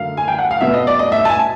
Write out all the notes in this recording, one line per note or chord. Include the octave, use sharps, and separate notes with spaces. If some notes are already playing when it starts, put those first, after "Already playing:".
Already playing: F#2 D3 F#3 A3 F5
G#5
G5
F#5
F5
B2 F#3 B3 E5
D#5
D5
D#5
E5
A5
G#5